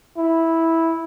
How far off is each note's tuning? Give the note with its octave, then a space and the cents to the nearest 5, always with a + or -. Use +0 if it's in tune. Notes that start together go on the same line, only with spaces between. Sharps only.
E4 -10